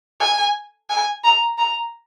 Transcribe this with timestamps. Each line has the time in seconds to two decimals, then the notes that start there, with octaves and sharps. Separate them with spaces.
0.20 G#5
0.90 G#5
1.24 A#5
1.58 A#5